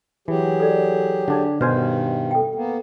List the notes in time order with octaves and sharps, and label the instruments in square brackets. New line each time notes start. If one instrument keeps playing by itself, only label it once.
[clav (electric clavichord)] E3 [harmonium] F#3 G4 G#4
[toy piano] A4 D5
[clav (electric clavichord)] D3 D4 G#5
[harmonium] G2 D#3 [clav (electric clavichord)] B2 C5 G#5 [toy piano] B4
[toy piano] A4 G5
[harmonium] A#3 B3